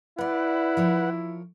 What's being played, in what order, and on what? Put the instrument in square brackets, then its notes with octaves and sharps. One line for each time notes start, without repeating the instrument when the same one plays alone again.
[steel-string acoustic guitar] B3 D5 [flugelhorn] E4 [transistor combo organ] B4 F#5
[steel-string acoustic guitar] F3 A#4 C#5